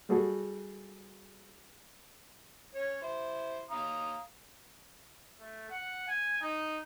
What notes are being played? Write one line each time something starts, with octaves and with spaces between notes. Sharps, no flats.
G3 F#4 G#4 A4
C#4 C#5
E4 C5
F5 A#5 D#6
A3
F#5
G#5
D#4